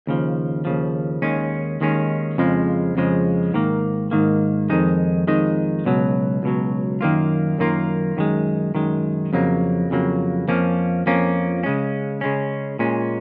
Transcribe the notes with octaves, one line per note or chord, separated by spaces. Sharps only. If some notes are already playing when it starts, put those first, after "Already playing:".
D#2 C#3 F3
D#2 C#3 F3
D#2 D#3 G#3 C#4
D#2 D#3 G#3 C#4
F2 C#3 F3 G#3
F2 C#3 F3 G#3
G#2 D#3 A#3
G#2 D#3 A#3
F2 D#3 G#3 D#4
F2 D#3 G#3 D#4
C#2 B2 F#3
C#2 B2 F#3
F#2 D#3 A#3 F4
F#2 D#3 A#3 F4
F#2 D#3 G#3
F#2 D#3 G#3
F2 C#3 F#3 A#3
F2 C#3 F#3 A#3
F2 F3 A#3 C#4
F2 F3 A#3 C#4
C#3 G#3 C#4
C#3 G#3 C#4
A#2 G#3 C#4